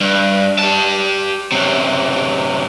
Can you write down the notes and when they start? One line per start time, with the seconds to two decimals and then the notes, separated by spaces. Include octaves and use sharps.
0.01 G2
0.59 G4 A5
1.52 F#2 C3